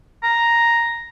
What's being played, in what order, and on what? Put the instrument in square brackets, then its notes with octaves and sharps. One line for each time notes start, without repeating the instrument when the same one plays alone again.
[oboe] A#5